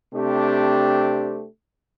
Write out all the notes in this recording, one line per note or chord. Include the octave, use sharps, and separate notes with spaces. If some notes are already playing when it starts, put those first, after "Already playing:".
C3 A3 C4 D4 G4